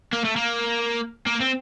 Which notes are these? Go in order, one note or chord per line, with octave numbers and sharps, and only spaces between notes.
A#3
A3
A#3
A#3
C4